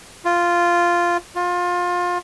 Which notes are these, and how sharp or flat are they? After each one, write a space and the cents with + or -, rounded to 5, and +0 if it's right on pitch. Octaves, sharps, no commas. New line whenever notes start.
F4 -5
F4 +25